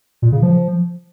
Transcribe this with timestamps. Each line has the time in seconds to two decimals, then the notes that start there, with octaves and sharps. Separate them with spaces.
0.22 A#2
0.32 C#3
0.42 F3